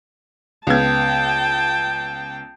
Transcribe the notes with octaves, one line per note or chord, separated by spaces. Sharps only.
C#2 B3 G5 A5 G#6